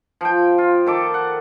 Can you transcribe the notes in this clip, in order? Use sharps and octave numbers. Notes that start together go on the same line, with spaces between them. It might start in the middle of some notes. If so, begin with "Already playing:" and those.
F3 G5
F4
D#3 A4 D6
F#5